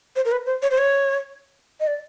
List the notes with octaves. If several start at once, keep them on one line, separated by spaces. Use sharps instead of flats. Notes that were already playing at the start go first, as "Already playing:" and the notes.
C5
A#4
B4
C5
C#5
C5
C#5
D#5
D5